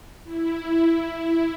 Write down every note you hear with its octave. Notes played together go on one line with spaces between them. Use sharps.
E4